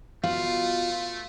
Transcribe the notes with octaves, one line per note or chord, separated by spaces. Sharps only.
B2 A3 F4 F5